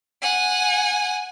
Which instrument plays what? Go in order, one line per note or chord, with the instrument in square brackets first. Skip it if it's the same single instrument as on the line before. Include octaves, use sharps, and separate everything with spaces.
[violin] F#5 G#5